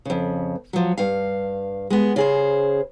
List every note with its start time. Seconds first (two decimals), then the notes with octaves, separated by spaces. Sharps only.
0.05 F2 C#3
0.73 F3 F#3
0.98 G2 F5
1.90 G#3 B3
2.16 C#3 G#4 C5